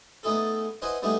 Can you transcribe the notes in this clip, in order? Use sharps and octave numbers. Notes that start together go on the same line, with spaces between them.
A3 B3 D#4 E4 G#4 A4
E4 B4 C5 D#5 F#5 G#5
G3 A3 B3 D#4 E4 G#4